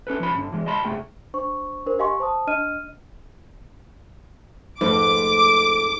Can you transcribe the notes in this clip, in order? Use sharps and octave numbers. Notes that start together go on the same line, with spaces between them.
C#4 A4 B4
F3 C#4 B5
G2 D3
E3 G#3
D2 D#5 A5 B5 C6
C2 G2 A3 G#4 G5
D4 C5 C#6
D4 A#4 C5
G4 D#5 F5 G#5 C6 C#6
C5 A5 D#6
D4 D#5 F6 D#7
F2 G#2 A3 B4 D6